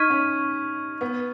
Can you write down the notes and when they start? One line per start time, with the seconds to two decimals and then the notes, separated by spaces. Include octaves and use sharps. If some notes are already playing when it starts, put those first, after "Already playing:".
Already playing: D#4 C#6 F6 G#6 B6 D#7
0.10 C#4
1.01 B3